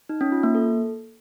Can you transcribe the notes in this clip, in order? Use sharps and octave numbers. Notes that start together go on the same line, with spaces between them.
D#4
C#4
F4
A#3
A4